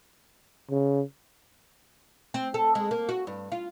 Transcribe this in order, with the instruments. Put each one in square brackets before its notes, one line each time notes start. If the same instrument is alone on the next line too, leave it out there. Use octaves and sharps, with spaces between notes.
[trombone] C#3
[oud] C4
A4
G#3
A#3
F#4
G2
F4